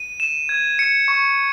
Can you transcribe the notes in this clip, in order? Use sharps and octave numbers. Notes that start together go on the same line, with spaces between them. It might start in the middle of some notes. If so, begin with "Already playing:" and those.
Already playing: D#7
E7
G#6
C#7
C#6